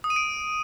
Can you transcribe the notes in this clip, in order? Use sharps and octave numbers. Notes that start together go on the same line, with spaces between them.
D#6
D#7
D7